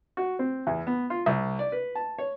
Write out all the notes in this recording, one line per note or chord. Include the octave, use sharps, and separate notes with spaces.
F#4
C4
E2
B3
F4
C2
D5
B4
A5
C#5